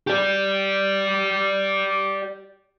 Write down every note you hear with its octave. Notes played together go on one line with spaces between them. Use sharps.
G4 D5